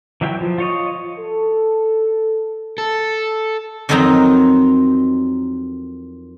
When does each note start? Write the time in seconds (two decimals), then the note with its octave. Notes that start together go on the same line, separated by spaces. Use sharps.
0.21 E3 F#3 E5 G5
0.41 F3
0.58 F4 C#5 D#5
1.19 A4
2.78 A4
3.89 F2 D#3 F#3 C4 D#4 A#5